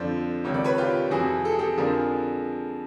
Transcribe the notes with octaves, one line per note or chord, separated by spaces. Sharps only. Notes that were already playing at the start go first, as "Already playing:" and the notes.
Already playing: F2 D3 F3 C5 D5
C#2 C3 D#3 C#5
D5
B4 C#5
F4 G4
F2 C3 E3 F#4 G#4
A4
G#4
G4 A4
F2 D3 F3 G#4 A#4